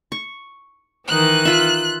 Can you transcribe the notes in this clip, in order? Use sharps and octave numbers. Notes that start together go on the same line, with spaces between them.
C#6
D#3 E3 D#4 F#6
F4 E5